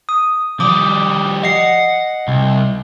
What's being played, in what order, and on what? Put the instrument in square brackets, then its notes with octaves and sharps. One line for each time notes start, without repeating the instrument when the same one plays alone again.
[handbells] D#6
[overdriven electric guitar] F3 G3 [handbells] D6 D#6
[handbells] D#5 C7 [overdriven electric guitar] F#5
[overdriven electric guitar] C2